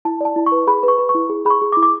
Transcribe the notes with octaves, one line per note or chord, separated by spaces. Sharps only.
E4 A5
D5 A5
E4
C#6
B4
G#4 B5
B4
C#6
B4
C#6
E4
G#4
G#4 B5
C#6
G#4
D6
E4
D6